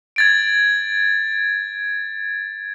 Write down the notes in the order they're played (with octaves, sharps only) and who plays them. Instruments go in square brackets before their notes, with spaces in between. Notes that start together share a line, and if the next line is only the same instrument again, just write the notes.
[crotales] G#6 A6 D7